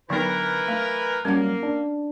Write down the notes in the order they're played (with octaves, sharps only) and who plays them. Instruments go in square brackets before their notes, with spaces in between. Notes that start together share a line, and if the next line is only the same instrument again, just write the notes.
[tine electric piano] D3 [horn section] E3 A#4 B4 [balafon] F#3 B3 D#4
[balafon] A3 [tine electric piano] B5
[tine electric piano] F#3 G3 [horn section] A#3 [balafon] C#4 F#5
[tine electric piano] D4